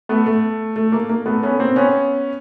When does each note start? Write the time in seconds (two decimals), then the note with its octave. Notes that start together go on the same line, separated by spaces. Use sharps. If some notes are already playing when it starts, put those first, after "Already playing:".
0.09 A3 B3
0.26 A3
0.76 A3
0.92 A#3
1.09 A#3
1.26 A3 B3
1.43 B3 C#4
1.59 A#3 C4
1.76 B3 C#4